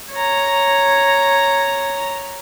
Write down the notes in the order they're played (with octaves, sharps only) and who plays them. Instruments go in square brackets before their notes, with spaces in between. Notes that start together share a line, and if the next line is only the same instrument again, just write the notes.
[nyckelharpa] C#5 A#5